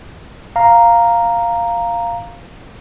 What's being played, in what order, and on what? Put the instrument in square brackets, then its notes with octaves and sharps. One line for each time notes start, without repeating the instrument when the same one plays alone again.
[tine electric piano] F5 A#5